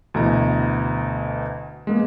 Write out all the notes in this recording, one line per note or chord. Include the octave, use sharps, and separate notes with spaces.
D2 B2 E3 A#5
G#3 A#3 B3